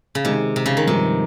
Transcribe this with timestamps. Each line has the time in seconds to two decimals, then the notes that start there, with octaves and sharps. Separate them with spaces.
0.15 C#3
0.24 C3 D#3 G#3 D#4
0.56 C3
0.66 C#3
0.77 D#3
0.87 G2 C3 F3 G#3 D#4 G#4